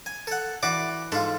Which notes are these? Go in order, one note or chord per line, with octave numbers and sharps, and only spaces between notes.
G#5
A4 F#5
E3 F#4 D5 D6
G#2 F4 A4